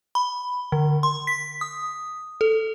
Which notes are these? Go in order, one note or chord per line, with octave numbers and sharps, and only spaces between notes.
B5
D3
C6
B6
D#6
A4